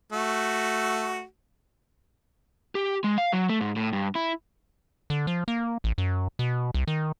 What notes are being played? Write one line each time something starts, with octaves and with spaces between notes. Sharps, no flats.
A3 F#4
G4
G#3
F5
F#3
A3
G#2
A2
G2
E4
D3
F3
A#3
A1
F#2
B2
C2
D#3